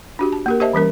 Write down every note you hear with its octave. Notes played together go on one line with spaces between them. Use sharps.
D4 F#4 G4
A5
A#3 G4 A#4
G4 C5 D#5 E5 A5
E3 G3 C#4 A#4